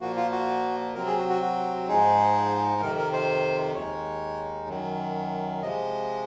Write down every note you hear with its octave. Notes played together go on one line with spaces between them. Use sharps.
A#2 F3 A#3 F#4
F4
F#4
C3 F#3 C4 A#4
G#4
F#4
F#4
F#4
G#2 F3 G#3 D#4 G#4
F2 C3 D#3 A#4
A#4
C5
D#2 D#3 G#3 D#4 C#5
F#2 D#3 F#3
C3 F3 G#3 D#5